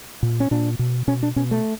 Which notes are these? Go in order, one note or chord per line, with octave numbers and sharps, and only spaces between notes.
A#2
C#4
A#2 D4
B2
B2 C#4
D4
B2 C#4
A3